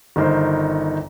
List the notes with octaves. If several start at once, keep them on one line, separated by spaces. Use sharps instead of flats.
G1 D#3 C5